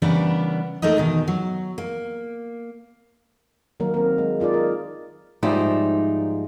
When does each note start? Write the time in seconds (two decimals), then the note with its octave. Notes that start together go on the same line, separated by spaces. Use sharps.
0.02 C#3 E3 G3 B3 D4 A#4
0.82 A3 A#3 D#4 A#4 D#5
0.97 E2 B2 D#3
1.28 F#3
1.78 A#3
3.80 D#3 F#3 A#3 A#4
3.94 C4 A#4
4.18 G#3
4.40 D#4 F4 G#4 D5
4.54 A#4
5.43 G#2 F3 G3 D#4 D5 E5